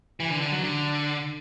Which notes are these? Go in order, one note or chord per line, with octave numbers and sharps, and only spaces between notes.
E3
D3
D3
F#3
D3